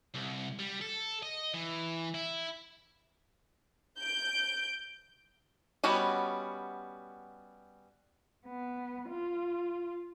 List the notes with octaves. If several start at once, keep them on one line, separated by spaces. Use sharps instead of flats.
C2
G3
A4
D#5
E3
E4
G6 D7
G3 B3 C#4 F#4 D#5
B3
F4